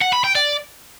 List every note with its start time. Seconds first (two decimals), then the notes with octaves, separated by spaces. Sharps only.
0.02 F#5
0.13 B5
0.24 G5
0.35 D5